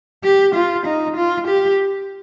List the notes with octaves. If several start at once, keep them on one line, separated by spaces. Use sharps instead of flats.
G4
F4
D#4
F4
G4